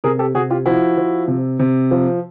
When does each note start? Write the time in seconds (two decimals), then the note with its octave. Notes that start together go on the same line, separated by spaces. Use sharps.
0.04 C3 G#4 A#4
0.19 G4 A4
0.34 C3 F#4 G#4
0.50 F4 G4
0.66 F3 E4 F#4
0.97 F3
1.28 C3
1.59 C3
1.91 F3